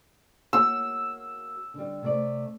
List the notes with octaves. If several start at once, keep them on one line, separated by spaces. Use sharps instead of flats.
A#3 F#4 E6
D3 G3
C3 A3 D5